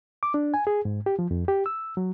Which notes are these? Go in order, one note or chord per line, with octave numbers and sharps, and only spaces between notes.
D6
D4
G#5
G#4
G#2
G4
F3
F2
G4
E6
F#3